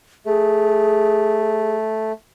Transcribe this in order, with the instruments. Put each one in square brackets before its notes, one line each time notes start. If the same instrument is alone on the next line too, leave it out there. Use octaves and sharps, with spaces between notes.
[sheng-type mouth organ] A3 [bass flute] G#4